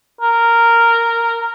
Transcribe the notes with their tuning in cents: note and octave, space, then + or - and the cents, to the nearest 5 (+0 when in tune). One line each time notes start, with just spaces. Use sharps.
A#4 -10